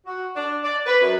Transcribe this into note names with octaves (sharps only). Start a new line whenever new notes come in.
F#4
D4
D5
B4
F#2